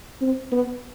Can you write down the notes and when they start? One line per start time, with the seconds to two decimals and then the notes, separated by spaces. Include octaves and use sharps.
0.21 C4
0.52 B3